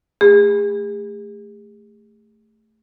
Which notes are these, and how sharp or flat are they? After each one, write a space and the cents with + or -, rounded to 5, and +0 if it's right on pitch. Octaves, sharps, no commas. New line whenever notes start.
A3 +0 G#4 -40 B5 +0